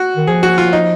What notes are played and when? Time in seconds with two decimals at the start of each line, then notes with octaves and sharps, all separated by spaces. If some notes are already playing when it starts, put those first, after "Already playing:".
Already playing: F#4
0.17 D#3
0.27 F3 G#4
0.43 F#4
0.58 F4
0.73 D#4